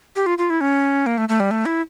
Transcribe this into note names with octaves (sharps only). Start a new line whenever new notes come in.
G4
F4
F4
E4
C#4
A#3
A3
A3
G3
A3
E4